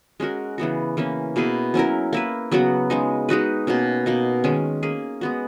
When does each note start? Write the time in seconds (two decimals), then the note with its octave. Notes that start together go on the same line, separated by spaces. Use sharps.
0.20 G#3 C#4 F#4 A#4
0.58 C#3 E3 B3 F#4
0.97 E3 A#3 C#4
1.36 B2 A#3 E4 G#4
1.74 F#3 C#4 E4 A#4
2.13 A#3 E4 B4
2.52 C#3 F#3 B3 F#4
2.90 C#3 G#3 D#4
3.29 G#3 D#4 F#4 B4
3.67 B2 A#3 C#4
4.06 B2 A#3 D#4
4.44 D#3 G#3 C#4
4.83 A#3 C#4 G#4
5.21 G#3 B3 F#4